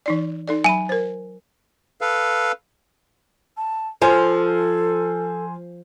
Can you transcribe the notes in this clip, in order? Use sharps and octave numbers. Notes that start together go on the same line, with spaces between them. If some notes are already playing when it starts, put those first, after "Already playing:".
E3 D#4 D5
D#4 A4 D5
F#3 G#5 B5 D#7
A#4 C5
A4 B4 F5
A5
F3 A4 C5 G#5